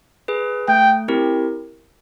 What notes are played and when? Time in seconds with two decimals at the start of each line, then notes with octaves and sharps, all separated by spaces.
0.28 G#4 B4
0.68 A3 G5
1.08 C4 E4 G4 A#4